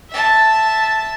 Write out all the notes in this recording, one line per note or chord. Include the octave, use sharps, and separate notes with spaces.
E5 A5